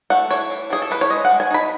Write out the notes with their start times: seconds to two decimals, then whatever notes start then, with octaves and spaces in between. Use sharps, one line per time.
0.10 A3 F#5
0.31 E3 C#5
0.50 E3
0.70 E3 G#4
0.82 A4
0.91 E3 B4
1.01 C#5
1.10 G#3 D#5
1.25 F#5
1.31 G#3
1.40 G#5
1.50 D#4 B5